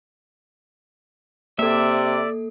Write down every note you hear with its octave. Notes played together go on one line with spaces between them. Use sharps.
C3 A#3 A4 D5 E5